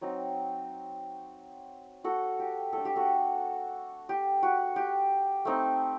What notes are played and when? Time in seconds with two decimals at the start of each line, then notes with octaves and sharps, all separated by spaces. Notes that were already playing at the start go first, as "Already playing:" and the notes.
0.01 F#3 C4 D#4
2.04 F#4 A4
2.39 G4
2.73 A3 D4 A4
2.85 G4
2.96 F#4 A4
4.09 G4
4.43 F#4
4.76 G4
5.45 A3 C4 D#4